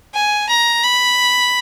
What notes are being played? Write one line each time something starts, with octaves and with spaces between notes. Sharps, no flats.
G#5
A#5
B5